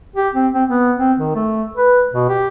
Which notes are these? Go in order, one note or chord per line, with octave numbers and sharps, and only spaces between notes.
G4
C4
C4
B3
C4
D#3
A3
B4
B2
G4